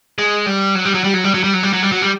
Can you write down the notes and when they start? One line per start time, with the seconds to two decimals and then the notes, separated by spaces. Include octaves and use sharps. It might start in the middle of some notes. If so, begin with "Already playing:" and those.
0.19 G#3
0.47 G3
0.75 F#3
0.85 G3
0.95 F#3
1.04 G3
1.14 F#3
1.24 G3
1.34 F#3
1.44 G3
1.54 F#3
1.63 G3
1.73 F#3
1.83 G3
1.92 F#3
2.02 G3